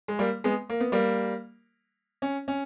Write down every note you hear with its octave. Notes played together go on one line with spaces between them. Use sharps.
G#3
G3 A#3
G#3 B3
A#3
B3
G3 A#3
C#4
C#4